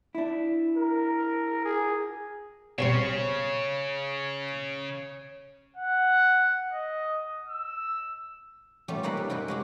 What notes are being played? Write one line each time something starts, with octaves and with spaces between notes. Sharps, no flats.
D4 E4
A#4
G#4
B1 G2 C#3 C4 C#5
F#5
D#5
E6
G3 A3 B3 C#4 F4 G4
C3 A#3 D#4 B4 B5
G3
F#2 C3 C#4 B4 G5 G#5
G#3 F#4 G4